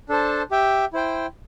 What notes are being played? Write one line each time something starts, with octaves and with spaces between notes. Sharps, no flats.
D4 A4 C5 A5
G4 E5 G5
E4 C5 G5